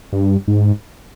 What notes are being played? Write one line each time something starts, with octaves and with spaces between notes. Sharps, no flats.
G2
G#2